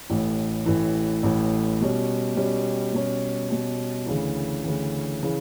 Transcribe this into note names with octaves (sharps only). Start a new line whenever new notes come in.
A1 A2 E3
A1 A2 E3
A1 A2 E3
B2 G3 C#4
B2 G3 C#4
B2 G3 C#4
B2 G3 C#4
D2 C#3 E3
D2 C#3 E3
C#3 E3